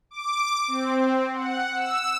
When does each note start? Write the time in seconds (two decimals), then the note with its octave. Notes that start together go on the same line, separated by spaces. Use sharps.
0.11 D6
0.68 C4
1.33 F#5
1.75 E6